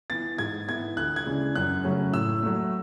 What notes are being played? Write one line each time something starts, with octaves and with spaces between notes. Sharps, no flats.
E3 B3 A6
G#2 G#6
E3 B3 E4 G#6
D2 F#6
G#6
C#3 E3 G#3 D4
F#2 F#6
C#3 F#3 A3 C#4
A2 E6
F#3 A3